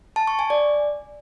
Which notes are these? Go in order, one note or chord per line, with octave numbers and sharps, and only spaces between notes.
A5
C#6
G#5
D5